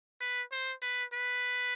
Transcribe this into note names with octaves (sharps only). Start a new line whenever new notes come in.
B4
C5
B4
B4